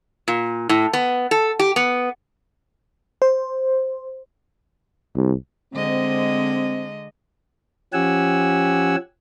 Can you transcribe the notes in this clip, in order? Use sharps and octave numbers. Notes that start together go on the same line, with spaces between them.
A#2
A2
B3
A4
G4
B3
C5
C2
D3 G#3 C4 D#5
F3 C#4 G4 F#5 G#5 E6